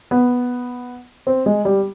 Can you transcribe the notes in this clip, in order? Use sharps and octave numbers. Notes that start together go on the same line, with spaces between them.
B3
C4
G#3
G3